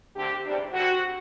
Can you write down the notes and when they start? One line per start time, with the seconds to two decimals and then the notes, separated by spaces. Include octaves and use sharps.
0.16 D3 A3 C4 G4
0.44 E2 C3 G3 D4
0.73 D3 G3 C4 F#4